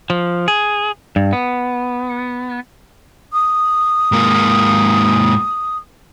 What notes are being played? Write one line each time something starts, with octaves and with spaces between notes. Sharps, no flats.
F3
G#4
G2
B3
D#6
G#2 A#3